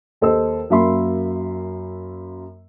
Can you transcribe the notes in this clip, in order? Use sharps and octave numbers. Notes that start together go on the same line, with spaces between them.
D#2 A4 C5 D#5 E6
F#2 A#3 E5 B5 C6